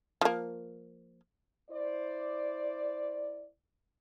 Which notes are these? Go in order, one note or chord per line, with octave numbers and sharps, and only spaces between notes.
F3 A#3
E4 C5 D5